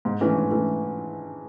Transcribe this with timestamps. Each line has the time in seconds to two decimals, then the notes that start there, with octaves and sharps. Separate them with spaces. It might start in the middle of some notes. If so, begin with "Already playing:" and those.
0.05 G#2
0.21 E3 A3 C#4
0.35 G#2
0.51 E3 A3 C#4